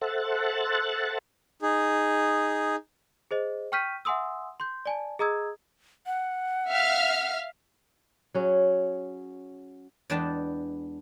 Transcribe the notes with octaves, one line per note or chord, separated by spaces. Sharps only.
A4 C5 E5 F#5 F#6 A6
D#4 G#4
G#4 C5 D#5
G5 C#6 F6 G6 B6 D#7
E5 F#5 G#5 C6 D#6 E6
C6 G6
D5 G#5 A5
G#4 D#5 A#5 D#6 E6 G#6
F#5
E5 F5 F6
F#3 C#4 G#4
E2 G#3 D4 B4 G5 A5